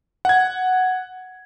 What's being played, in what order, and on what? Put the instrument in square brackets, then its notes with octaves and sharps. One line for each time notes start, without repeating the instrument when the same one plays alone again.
[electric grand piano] F#5 G#6